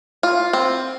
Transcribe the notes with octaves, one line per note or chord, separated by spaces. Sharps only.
F4
C4